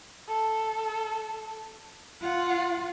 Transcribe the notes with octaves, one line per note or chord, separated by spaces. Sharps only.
A4
F4 F#5